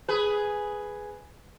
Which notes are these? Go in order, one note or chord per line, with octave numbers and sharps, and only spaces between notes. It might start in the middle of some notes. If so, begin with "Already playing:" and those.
G#4 B4